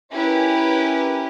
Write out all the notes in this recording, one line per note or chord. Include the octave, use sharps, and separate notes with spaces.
C#4 E4 G4 A#4 B4